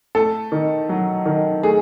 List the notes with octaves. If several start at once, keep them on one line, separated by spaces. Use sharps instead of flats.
A3 A4
D#3
F#3
D#3
A3 G#4